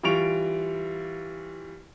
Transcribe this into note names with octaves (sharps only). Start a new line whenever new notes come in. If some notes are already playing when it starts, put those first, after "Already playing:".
E3 G3 F4 C#6 D7 F7